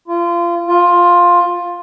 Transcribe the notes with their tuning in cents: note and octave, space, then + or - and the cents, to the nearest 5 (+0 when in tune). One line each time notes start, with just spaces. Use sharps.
F4 -25
F4 +10